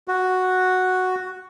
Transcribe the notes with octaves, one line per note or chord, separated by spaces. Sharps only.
F#4